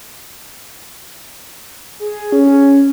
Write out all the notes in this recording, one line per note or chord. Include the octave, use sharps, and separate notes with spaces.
G#4
C#4